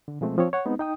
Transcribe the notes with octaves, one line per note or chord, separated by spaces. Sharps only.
D3
B2 F3 G#3 A3 C4
F3 C4 C#5
C#5 F#5
G#3 B3 C4 D#4
D#4 G5 D#6